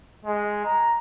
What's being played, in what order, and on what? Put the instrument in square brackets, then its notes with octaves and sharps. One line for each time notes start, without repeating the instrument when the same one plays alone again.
[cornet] G#3
A#5